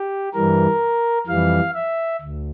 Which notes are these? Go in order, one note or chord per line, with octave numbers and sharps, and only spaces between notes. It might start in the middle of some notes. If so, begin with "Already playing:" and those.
Already playing: G4
G2 E3 G3 A#4
F2 E3 G3 F5
E5
D2